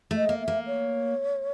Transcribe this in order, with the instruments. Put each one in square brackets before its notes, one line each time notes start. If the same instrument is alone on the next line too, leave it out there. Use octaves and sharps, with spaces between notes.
[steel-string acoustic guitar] A3
[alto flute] D#5
[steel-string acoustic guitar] A#3
[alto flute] E5
[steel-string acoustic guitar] A#3
[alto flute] C#5